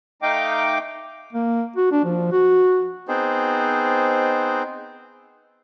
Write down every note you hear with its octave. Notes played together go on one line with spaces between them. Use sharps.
A3 D#4 D#5 F5 G5 D6
A#3
F#4
D4
F3
F#4
B3 C4 D#4 G#4 C5